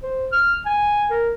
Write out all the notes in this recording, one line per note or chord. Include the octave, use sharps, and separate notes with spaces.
C5
F6
G#5
A#4